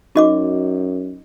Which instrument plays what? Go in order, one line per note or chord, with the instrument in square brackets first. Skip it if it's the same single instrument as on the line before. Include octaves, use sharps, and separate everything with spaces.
[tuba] F#2 [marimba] D#4 [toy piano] F#4 D#5 D6